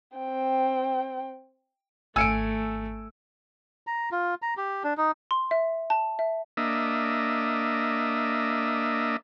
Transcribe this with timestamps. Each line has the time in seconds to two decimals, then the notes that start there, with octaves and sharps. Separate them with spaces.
0.17 C4 G5
2.16 G#1 A3 G#5 E6 C#7 D7
3.87 A#5
4.12 F4
4.42 A#5
4.57 G4
4.84 D4
4.98 D#4
5.31 C6
5.51 E5
5.90 A5
6.19 E5
6.57 A#3 D4 D#5 E5